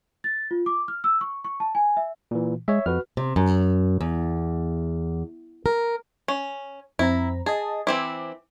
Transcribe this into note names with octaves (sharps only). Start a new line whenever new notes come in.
A6
F4
D6
F6
E6
C#6
C#6
A5
G#5
E5
A#2 E3
G#3 C#5 E5
F2 F#4 B4 F6
C3
F#2
E2
A#4
C#4
F2 C4 E4 A#5
G#4 D#5 A5
E3 C4 E4 D6